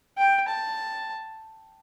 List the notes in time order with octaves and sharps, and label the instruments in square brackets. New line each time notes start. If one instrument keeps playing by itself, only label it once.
[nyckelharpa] G5
A5